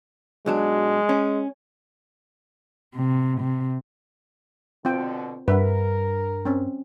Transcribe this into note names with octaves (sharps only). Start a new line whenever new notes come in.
B1 F#3 G#3 D4
C#4
C3
C3
B2 D3 C4 F4 G5
G2 A#4 B4 E5 F#5
C4 C#4